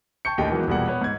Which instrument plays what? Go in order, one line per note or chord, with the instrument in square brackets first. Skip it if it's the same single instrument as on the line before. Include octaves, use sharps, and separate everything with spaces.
[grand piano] G5 A5 C#6 G6 C#7
D#2 A2 D3 G4 D#5 G5
D#3 E3 F#3 G#3 A#3 B3
E1 E2 A#2 G3 G#4 F#5
B3 C#5
G#2 G#6